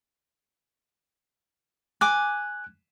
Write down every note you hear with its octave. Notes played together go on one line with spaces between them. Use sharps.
G#5 D6 F#6